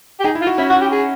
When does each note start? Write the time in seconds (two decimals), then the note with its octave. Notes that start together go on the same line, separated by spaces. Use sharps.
0.20 G4
0.24 D#4 G#4
0.35 E4
0.41 F4
0.47 F#4
0.58 C#4 E4
0.69 F#4
0.81 G4
0.92 G#4